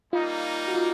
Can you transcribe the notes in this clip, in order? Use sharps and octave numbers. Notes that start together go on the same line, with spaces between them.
G3 A#3 D#4 F4
F#4
F4